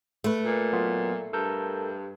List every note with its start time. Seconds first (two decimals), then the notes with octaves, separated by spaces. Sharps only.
0.24 A3 B4
0.45 A#2
0.73 F#3 B3 F4
1.33 G2 A4 A#4 G6